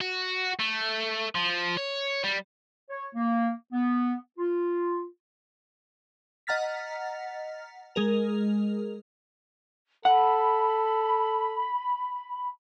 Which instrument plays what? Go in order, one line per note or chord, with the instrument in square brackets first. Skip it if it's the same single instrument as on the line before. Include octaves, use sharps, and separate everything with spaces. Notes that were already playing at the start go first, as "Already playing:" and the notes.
[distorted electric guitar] F#4
A3
F3
C#5
G3
[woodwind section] C#5
A#3
B3
F4
[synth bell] D#5 F#5 A#5 F6 A6 B6
G#3 G#4 A#4 F7
[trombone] A4 [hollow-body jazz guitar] F#5 [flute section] B5